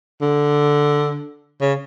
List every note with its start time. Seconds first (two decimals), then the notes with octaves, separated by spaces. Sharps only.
0.21 D3
1.61 C#3